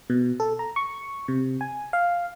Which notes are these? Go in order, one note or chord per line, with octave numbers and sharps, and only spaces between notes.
B2
A4
A#5
C#6
C3
G#5
F5